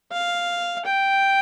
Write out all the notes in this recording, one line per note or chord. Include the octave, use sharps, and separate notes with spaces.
F5
G5